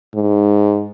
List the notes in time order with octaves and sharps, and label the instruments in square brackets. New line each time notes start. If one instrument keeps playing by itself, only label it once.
[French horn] G#2